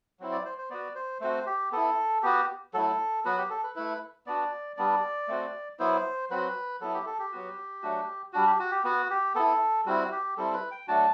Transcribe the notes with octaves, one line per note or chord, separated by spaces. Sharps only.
F#3 C4 E4
D5
C5
C5
B3 F#4 D5
C5
A3 C4 F#4 C5
G4
B3 E4 A4
B3 F#4 G4
F#3 A3 E4 A4
F#3 B3 F#4 B4
G4
A4
B4
A3 E4 B4
B3 D4 F#4 D5
G3 B3 D4 D5
A3 C4 F#4
F#3 B3 E4 C5
F#3 C4 F#4 B4
F#3 B3 E4 A4
G4
A4
G4
F#3 B3 F#4
F#3 A3 D4 F#4
G3 D4 F#4
G4
F#4
G4
B3 F#4
G4
B3 E4 A4
G3 C4 E4 F#4
G4
G3 C4 E4 A4
B4
G5
F#3 A3 D4 F#4 A5